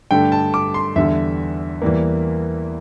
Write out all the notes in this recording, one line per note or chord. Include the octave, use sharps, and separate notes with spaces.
G2 D3 A3 G5
A5
D6
C6
E2 D3 G3 E5
E2 E3 G3 A#3